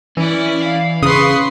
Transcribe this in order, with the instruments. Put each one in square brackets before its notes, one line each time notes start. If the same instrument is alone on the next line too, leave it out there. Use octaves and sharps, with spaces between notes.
[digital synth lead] E3 [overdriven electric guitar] C#4 [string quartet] E4 D5
[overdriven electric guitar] F5
[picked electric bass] C#3 [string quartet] B4 C6 C#6 [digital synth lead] D#6